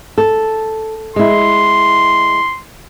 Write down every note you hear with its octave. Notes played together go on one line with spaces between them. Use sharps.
A4
G#3 E4 C6